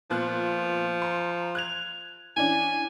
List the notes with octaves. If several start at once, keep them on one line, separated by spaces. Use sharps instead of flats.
A#2 F3 B3 F#6
A#5 C6
F#6 G#6 F7
E3 C#4 D4 G#5